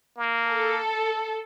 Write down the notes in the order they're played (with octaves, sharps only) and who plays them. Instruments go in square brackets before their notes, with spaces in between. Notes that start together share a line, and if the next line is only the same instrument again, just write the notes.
[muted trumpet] A#3
[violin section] A4